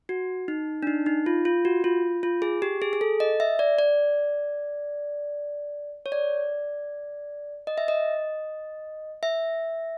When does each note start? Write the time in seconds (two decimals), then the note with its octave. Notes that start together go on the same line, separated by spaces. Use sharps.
0.09 F#4
0.48 D#4
0.83 D4
0.87 D#4
1.06 D#4
1.26 F4
1.45 F4
1.65 F#4
1.84 F4
2.23 F4
2.42 G#4
2.62 G4
2.82 G#4
2.93 G#4
3.01 A4
3.20 D#5
3.40 E5
3.59 D5
3.79 D5
6.06 C#5
6.12 D5
7.67 D#5
7.78 E5
7.88 D#5
9.23 E5